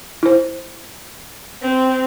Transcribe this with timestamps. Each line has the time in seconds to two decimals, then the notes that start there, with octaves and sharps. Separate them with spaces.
0.23 E4 C5
1.61 C4